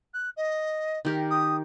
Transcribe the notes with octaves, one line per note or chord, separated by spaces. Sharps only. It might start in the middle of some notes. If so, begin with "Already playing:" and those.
F#6
D#5
D#3 G4 A#4
D#6